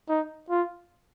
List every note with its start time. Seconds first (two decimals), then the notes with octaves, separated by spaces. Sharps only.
0.09 D#4
0.50 F4